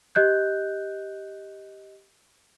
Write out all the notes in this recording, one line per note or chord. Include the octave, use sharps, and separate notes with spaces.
G4 D#5 F#6 G6